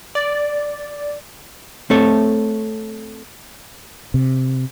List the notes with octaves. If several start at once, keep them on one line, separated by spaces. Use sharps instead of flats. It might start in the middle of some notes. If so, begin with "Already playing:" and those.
D5
A3 C4 A4 C#5
C3